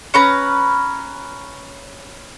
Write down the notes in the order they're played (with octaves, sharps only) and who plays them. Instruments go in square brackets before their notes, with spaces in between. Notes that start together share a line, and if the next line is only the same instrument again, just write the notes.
[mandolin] C#4 B4 A#5